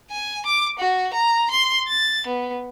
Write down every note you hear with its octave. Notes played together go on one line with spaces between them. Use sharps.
G#5
D6
F#4
A#5
C6
A6
B3